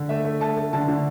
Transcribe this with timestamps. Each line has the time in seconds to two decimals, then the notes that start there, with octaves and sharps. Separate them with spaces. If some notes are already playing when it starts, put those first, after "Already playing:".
Already playing: D3
0.09 A3 E5
0.25 A3
0.41 A3 A5
0.57 A3
0.73 D3 A5
0.88 D3